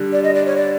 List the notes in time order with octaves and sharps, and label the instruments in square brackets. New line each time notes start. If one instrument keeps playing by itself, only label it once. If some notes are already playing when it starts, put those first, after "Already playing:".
Already playing: [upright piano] D3 G3
[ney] D5
D#5
D5
C#5
D5